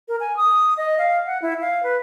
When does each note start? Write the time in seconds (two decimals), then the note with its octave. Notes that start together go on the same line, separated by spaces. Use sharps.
0.08 A#4
0.20 G#5
0.37 D#6
0.77 D#5
0.98 F5
1.26 F#5
1.42 E4
1.61 F5
1.83 B4